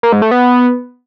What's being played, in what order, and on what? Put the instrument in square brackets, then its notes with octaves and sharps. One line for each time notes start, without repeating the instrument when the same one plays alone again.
[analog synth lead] A#3
G#2
A3
B3